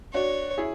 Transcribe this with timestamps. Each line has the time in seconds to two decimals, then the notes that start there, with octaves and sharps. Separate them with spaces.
0.13 D4 F#4 C#5
0.58 E4 G#4